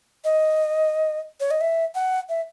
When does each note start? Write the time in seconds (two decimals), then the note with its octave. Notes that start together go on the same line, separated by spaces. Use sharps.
0.24 D#5
1.40 C#5
1.51 D#5
1.61 E5
1.95 F#5
2.29 E5